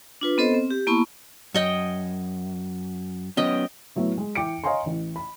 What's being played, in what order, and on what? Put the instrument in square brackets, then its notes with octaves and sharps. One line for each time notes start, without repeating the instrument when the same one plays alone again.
[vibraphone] D4 F4 B4
B3 C4 A4 C5 D#5
C4
G4
A#3 B3 E4 A5 B5 C#6
[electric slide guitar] F#2 [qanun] C#5 D#5 G5
[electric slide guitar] F#3 B3 C#4 [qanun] D#5 G5
[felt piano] A2 F#3 A3 B3
G#3
E3 G5 D6 C#7 D7
C#5 D#5 F5 G#5 A#5 C6
A1
B5